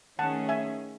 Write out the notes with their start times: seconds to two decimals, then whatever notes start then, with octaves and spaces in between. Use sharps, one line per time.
0.19 D#3 A3 C#4 G#4 F#5 A5
0.49 E5 G#5